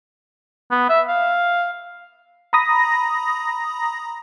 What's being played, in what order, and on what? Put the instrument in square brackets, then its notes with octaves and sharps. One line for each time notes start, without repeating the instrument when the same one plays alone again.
[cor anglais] B3
E5
F5
[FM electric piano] A#5 B5 D#6 A#6